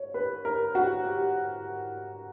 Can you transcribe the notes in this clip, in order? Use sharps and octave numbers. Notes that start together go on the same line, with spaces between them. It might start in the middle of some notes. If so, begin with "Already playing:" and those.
Already playing: C#5
B4
A#4
F#4
G4